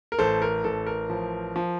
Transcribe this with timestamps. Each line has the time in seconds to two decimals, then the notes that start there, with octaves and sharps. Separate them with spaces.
0.12 A#4
0.19 A1 A4 C5
0.42 A#4
0.64 A1 A4
0.86 A#4
1.10 F3
1.56 F3